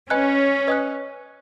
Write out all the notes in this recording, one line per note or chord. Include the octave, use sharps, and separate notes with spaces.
C#4 B4 D#5 G#5 B5 F#6
B4 D#5 G#5 D#6 F#6